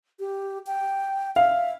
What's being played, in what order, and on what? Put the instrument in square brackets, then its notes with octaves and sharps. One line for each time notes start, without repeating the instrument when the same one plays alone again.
[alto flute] G4
G5
[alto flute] E5 [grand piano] F5